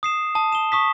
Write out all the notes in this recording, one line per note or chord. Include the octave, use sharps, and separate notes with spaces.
D#6 C7 E7
A5 D#6
E7 G7
C#6 D#6 B6